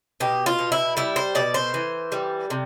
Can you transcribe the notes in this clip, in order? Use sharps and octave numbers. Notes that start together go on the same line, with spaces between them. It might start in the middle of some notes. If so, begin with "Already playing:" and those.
B2 G4
F4
B2
E4
G3 E4
C5
B2 D5
C5
E3
G3
C3